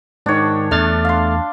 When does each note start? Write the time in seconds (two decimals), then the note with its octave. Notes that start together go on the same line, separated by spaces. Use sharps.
0.26 G#2 D#3 D4 C#5
0.71 E2 A3 B3 D4 F6 A6
1.05 F5 C6